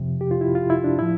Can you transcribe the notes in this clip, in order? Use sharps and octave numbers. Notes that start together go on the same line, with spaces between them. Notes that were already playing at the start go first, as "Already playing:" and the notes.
Already playing: F2 C3 F3
G4
F4
E4
F4
E4
D4
A2 F3 E4